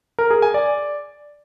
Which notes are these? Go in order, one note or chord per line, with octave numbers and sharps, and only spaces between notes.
A#4
G#4
G#5
D5